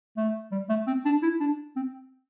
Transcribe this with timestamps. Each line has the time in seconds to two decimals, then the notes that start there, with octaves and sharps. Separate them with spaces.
0.17 A3
0.52 G3
0.69 A3
0.87 C4
1.05 D4
1.22 E4
1.40 D4
1.76 C4